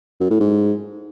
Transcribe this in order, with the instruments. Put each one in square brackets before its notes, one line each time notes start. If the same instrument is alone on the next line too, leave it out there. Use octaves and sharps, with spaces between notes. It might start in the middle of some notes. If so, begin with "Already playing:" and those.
[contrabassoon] F#2
A2
G#2